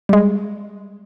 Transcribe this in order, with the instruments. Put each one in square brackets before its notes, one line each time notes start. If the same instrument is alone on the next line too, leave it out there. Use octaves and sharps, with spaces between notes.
[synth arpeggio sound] G3 G#3